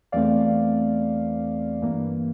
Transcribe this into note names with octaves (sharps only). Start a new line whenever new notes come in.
E2 E3 A3 C4 D5 F5
G2 E3 A#3